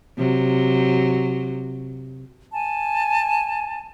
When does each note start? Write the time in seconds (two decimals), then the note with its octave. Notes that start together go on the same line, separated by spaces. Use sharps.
0.17 C3 F#3
2.52 G#5 A5